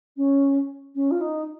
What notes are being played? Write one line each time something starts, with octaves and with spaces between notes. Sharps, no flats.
C#4
C#4
F4
D#4